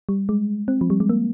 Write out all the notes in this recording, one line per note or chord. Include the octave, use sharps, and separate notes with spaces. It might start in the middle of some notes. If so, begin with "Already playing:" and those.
G3
G#3
C4
F3
G3
G#3
A#3